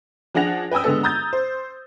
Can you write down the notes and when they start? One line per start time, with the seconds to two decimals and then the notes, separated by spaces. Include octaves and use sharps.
0.34 F3 D4 G#4 F#5 A#6 F7
0.71 B4 G5 G#5 D#6 E6
0.84 D3 G#3 B3 A4
1.03 A#5 D#6 G6 A6
1.33 C5